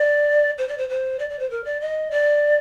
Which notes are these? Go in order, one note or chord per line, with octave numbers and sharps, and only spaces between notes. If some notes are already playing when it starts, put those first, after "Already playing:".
Already playing: D5
C5
D5
C5
C5
D5
D5
C5
A#4
D5
D#5
D5